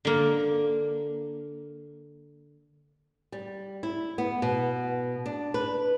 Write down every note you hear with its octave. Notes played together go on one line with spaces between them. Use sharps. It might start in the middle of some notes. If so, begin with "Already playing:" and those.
D3 A#3
G3
E4
B3
B2
D4
B4